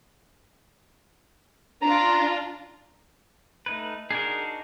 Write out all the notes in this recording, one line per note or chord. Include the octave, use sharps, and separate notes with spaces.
D4 F4 A#5
A3 D#4 B4
D4 D#4 F#4 G#4 A#4